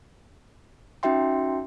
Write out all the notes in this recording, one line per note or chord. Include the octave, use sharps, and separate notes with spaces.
C#4 D#4 F#4 E5 G5 C6